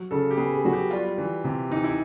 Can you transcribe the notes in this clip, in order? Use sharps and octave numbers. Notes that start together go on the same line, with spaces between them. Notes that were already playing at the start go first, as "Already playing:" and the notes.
Already playing: F#3
C#3 A4
G4
B3 G#4
G#4
F#3 F#4
G4
G3 F4
E3
C3
E3 D#4
E4